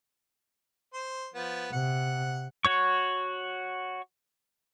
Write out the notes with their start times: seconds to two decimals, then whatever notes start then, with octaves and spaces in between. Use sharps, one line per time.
0.94 C5 C6
1.34 F3 B3
1.72 C3 F#5
2.65 F#4 C#5 C#6